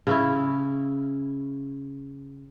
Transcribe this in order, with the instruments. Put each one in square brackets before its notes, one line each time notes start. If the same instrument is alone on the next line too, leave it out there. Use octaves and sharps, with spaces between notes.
[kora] C#3 C#4 E4